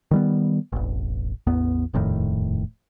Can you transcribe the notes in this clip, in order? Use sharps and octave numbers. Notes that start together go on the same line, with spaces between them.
D#3 G3 B3
E1 A1
A1 E2 B3
D#1 F2 A2 D#3